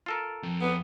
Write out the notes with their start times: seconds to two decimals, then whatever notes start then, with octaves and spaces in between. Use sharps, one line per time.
0.06 F4 A4 A#4
0.43 F2
0.61 B3